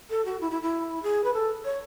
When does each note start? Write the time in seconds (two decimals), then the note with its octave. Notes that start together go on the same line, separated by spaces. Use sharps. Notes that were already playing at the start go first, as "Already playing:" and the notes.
0.10 A4
0.25 F#4
0.41 E4
0.51 E4
0.62 E4
1.03 G#4
1.24 B4
1.33 A4
1.65 C#5